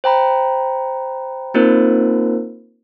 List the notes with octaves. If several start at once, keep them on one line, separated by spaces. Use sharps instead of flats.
C5 G5 A#5 B5
A#3 C4 D#4 F4 A#4 C5